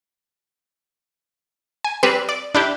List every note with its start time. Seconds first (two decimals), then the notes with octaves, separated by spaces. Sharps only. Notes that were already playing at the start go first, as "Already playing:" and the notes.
1.84 G#5
2.03 G3 C4 B4
2.29 D5
2.55 D4 E4 G4